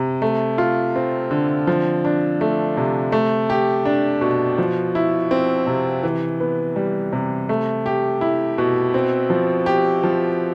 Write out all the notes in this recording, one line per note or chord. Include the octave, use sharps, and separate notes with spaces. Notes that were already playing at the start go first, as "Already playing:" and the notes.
Already playing: C3
A3
F4
C4
D3
F3
D4
A3
C3
A3
G4
D4
B2
F3
E4
C4
C3
E3
B3
G3
C3
A3
G4
E4
B2
C4
F3
G4
F3